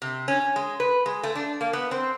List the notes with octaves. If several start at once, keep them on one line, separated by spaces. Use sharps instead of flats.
C3
C#4
G#3
B4
G#3
A3
D4
A#3
B3
C4